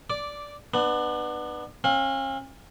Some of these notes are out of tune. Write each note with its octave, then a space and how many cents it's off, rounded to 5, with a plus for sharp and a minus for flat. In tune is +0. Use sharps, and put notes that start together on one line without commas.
D5 -10 D6 +0
B3 +0 D4 +35
C#4 -45 F5 +25